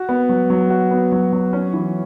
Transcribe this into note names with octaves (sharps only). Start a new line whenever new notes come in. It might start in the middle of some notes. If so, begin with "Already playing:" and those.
Already playing: F#4
B3
F#3
F#3
F#4
B3
F#3
F#3
C#4
E3